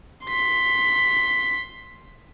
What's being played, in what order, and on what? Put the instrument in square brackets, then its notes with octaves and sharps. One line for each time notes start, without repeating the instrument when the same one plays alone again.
[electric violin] C6 B6